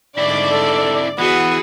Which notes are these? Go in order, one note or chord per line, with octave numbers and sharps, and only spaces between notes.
G#2 D3 C4 E4 D5
A4
E3 B3 F#4 G#4 B4